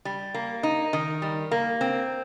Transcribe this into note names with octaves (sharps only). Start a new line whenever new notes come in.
G3
A#3
D#4
D#3
G3
A#3
C4